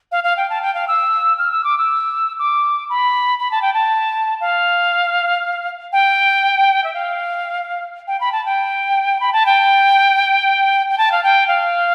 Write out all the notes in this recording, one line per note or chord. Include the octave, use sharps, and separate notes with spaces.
F5
F5
G5
A5
G5
F5
E6
F6
E6
D6
E6
D6
B5
B5
A5
G5
A5
F5
G5
E5
F5
G5
B5
A5
G5
B5
A5
G5
G5
A5
F5
G5
F5